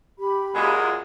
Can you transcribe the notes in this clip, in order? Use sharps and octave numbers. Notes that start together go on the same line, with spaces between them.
G4 B5
F#2 A#2 G#3